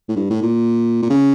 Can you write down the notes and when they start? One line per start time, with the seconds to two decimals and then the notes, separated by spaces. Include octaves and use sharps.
0.09 A2
0.16 G2
0.30 A2
0.42 A#2
1.02 A#2
1.10 C#3